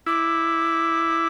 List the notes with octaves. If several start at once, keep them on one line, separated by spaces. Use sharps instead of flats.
E4 D6